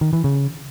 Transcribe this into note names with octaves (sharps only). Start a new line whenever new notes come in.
D#3
E3
C#3